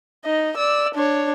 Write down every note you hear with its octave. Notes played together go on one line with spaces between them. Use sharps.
D#4 D#5
D5 E6
D4 C#5